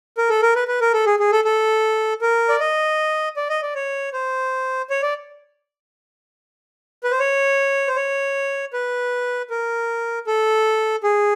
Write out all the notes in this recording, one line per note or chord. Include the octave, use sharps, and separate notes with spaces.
A#4
A4
A#4
B4
B4
A#4
A4
G#4
G#4
A4
A4
A#4
D5
D#5
D5
D#5
D5
C#5
C5
C#5
D5
B4
C5
C#5
C5
C#5
B4
A#4
A4
G#4